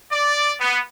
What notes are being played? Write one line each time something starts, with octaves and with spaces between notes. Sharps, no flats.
D5
B3